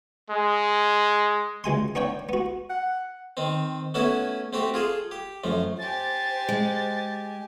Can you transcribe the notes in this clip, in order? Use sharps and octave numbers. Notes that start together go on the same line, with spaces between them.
G#3
C#2 G#3 G#5 C6
B3 D4 C#5 G5
B3 F#4
F#5
D#3 C4
A3 B3 C#4 E4 F#4 A4
A3 C4 F#4 G4
F4 G#4 A4
G4
F#2 F3 A3
G4 C5 G#5 A6
G#3